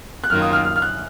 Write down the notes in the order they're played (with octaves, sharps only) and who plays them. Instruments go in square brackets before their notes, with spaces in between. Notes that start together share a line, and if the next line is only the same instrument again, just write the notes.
[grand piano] F#6
[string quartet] F#2 D#3 A#3 F4 [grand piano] F6
[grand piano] D#6
F6
F6
F6
F#6